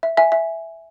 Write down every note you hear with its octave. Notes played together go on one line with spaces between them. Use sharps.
E5
E5 G#5
E5